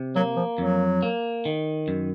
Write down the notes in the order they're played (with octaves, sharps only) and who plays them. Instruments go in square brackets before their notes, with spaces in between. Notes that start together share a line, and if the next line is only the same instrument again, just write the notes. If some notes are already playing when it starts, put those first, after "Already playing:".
Already playing: [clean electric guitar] C3
[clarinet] F#3 [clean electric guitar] A#3
[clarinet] F3
[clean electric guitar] F2 [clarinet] F#3
[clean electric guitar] A#3
D#3
F#2